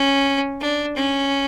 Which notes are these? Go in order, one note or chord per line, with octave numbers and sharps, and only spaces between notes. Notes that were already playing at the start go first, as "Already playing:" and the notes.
Already playing: C#4
D4
C#4